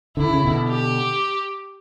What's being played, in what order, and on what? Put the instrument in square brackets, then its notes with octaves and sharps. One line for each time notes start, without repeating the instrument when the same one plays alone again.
[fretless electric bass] D3 [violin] E4
[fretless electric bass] C#3
B2 D3
[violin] G4